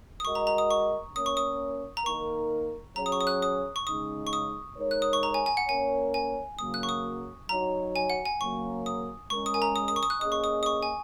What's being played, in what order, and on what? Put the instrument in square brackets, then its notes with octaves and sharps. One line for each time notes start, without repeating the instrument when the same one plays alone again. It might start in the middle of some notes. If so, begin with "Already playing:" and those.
[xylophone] D#6
[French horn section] G#3 F#4 A#4 D#5 [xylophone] C#6
[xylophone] A#5
A#5
D#6
C#6
[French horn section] A#3 C#4 A#4 C#5 [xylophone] D#6
[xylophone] C#6
D#6
A#5
[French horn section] D#3 A#3 D#4 A#4 [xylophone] C#6
[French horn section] F#3 C#4 G#4 C#5 [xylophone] A#5
[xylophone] D#6
C#6
D#6
F#6
D#6
C#6
[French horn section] C#3 G#3 D#4 [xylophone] D#6
[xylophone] C#6
D#6
[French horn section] G#3 D#4 A#4 C#5
[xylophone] F#6
D#6
C#6
A#5
G#5
G#5
F#5
[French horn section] A#3 C#4 A#4 C#5 [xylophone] G#5
[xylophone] G#5
[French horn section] C#3 F#3 A#3 [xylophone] D#6
[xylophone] F#6
C#6
D#6
[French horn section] F#3 D#4 F#4 C#5 [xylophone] A#5
[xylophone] G#5
F#5
G#5
[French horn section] C#3 F#3 A#3 [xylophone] C#6
[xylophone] D#6
[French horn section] G#3 C#4 A#4 [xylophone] C#6
[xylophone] D#6
G#5
A#5
D#6
D#6
C#6
D#6
F#6
[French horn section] A#3 C#4 G#4 D#5 [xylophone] D#6
[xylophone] C#6
D#6
D#6
C#6
G#5